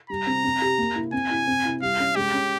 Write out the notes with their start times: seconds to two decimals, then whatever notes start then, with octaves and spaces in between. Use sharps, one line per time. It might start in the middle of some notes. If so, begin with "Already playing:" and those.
0.10 G3 A#5
0.27 C4
0.44 C4
0.62 G4
0.78 A#3
0.96 E4
1.13 C4 G#5
1.30 E4
1.47 C4
1.65 E4
1.82 G3 F5
1.99 C#4
2.16 G#3 G4
2.34 C#4